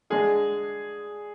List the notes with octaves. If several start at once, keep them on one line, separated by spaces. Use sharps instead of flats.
D3 G#3 D4 G#4